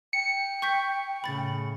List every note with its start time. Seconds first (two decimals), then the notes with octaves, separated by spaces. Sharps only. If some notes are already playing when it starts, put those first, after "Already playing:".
0.13 G5 C#7
0.62 C#6 G6 B6
1.24 A2 C#3 B5 A6